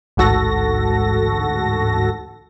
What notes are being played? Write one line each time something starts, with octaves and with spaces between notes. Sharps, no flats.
A1 D2 G#2 F#4 A4 A#6